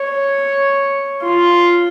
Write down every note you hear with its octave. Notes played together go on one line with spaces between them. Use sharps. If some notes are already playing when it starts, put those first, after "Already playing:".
Already playing: C#5
F4